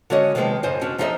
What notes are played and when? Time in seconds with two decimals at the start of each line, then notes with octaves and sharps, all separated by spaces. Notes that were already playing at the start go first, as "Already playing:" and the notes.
0.10 D3 G#3 C#4 F#4 C#5 D#5
0.35 C3 D#3 F3 F#3 G#3 B3
0.63 F#2 C#3 C5 D#5 G#5
0.81 C#4 D4 F#4
0.98 F3 D#4 E4 G#4 D#5 E5